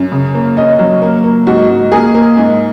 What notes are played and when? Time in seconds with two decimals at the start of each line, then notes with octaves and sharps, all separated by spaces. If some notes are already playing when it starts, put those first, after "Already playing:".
Already playing: F#2
0.12 C#3
0.35 A#3
0.57 C#4 D#5
0.79 F#3
1.02 A#3
1.24 A#3
1.47 G#2 F#4
1.69 G#2
1.92 A#3 G#4
2.14 A#3
2.37 G#2